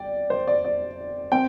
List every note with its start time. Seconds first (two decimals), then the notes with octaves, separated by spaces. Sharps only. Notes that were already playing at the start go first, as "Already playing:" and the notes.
Already playing: D5 G5
0.30 C5
0.47 D5
0.65 D5
1.32 C4 G5